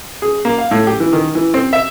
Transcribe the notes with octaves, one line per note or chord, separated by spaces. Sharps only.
G#4
A#3
F5
A2
G4
E3
D#3
E3
C4
E5